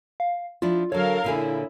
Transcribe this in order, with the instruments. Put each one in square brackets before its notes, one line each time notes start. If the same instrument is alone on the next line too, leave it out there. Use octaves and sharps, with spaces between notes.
[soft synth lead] F5
[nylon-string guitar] F3 D4 E4 [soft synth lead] F4
[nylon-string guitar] D3 F#3 [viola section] A4 A#4 F5 [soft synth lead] C#5
[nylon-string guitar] A#2 D3 G#4 [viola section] E4